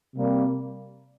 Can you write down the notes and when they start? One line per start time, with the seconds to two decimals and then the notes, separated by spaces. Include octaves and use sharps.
0.15 C3 G3 A#3